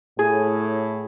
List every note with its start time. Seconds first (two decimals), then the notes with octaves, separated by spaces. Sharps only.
0.18 A2 G#4